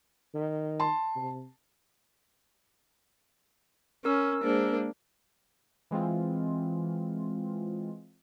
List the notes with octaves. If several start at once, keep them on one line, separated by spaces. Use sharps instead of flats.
D#3
A5 C6
C3
C#4 A#4 E6
G#3 A#3 D4 G#4 C5
E3 G#3 C4 F4